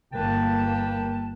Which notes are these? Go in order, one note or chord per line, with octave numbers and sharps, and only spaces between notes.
G1 A#3 B4 G5 A5